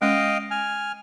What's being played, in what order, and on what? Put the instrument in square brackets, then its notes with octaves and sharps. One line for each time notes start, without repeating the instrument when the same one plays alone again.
[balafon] G#3 C#4 [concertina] D#5 F5 G5
[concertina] G#5 F6